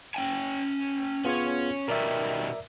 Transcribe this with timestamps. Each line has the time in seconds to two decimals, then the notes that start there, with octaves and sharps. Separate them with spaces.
0.14 C#4 G5 G#5
1.25 B3 C#4 F4 G#4 C#5
1.88 B2 D#3 G3 A#4 D5 E5